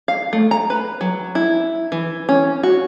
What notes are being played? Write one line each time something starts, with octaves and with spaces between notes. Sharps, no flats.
F5
A3
A#5
B4
F#3
E4
E3
C#4
F#4